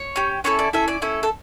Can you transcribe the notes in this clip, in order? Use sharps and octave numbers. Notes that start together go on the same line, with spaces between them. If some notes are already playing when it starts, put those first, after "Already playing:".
Already playing: C#5
C#4 G4
C#4 E4 A4 C#5
D5
C#4 E4 A4 E5
D5
C#4 E4 A4
A4